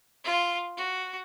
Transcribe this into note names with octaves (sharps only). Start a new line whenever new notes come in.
F4
F#4